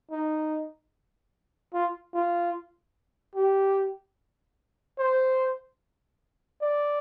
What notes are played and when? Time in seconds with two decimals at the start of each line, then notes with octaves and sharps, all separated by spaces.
0.11 D#4
1.73 F4
2.14 F4
3.35 G4
4.99 C5
6.61 D5